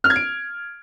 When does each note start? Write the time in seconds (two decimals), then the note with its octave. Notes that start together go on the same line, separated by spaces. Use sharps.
0.04 F6
0.10 G#6
0.16 D7